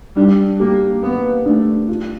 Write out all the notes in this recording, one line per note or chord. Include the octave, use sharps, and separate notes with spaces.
G3 D4
A#3 G4
A#3 B3
A3 D4
F4